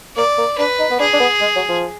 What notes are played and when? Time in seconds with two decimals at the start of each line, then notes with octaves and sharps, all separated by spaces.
0.16 A#3 D5
0.38 A#3
0.58 D4 B4
0.79 D#4
0.91 B3
1.00 D4 G#4
1.13 D4
1.20 B3
1.41 G#3
1.56 F#3
1.69 F3